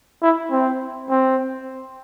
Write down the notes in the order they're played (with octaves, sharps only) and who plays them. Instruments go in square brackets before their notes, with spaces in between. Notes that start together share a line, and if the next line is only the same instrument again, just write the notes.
[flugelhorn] E4
C4
C4